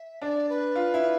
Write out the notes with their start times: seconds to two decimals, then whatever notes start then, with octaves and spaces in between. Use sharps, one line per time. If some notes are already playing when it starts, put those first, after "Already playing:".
Already playing: E5
0.22 D4 D5
0.49 B4
0.75 F4
0.94 E4